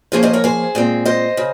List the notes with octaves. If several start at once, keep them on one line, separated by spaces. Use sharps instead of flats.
F3 A#3 C#4 G#4 C5
C5 D#5
A#4 C#5
G#4 C5
A#2 G#3 C4
C5 D#5
C#3